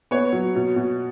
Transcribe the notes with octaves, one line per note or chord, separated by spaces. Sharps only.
B3 C#5
F#3
B2
B2